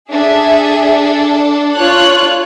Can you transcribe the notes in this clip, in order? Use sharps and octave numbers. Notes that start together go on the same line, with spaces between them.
D4 G#4 A4 E5
F4 C#5 F#6